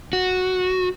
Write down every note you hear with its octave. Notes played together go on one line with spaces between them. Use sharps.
F#4